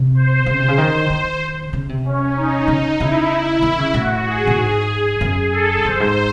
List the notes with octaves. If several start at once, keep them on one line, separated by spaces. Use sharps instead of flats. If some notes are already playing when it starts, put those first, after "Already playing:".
Already playing: C3
C5
C#3 C5
C3
C#3
D#3 C5
D#3
C#3
C3
C#4
D#4
C#3
C#3 E4
D#3 E4
C#3
A2 F#4
G#4
A2
G#2
F#2
A4
F#2 C5
G#2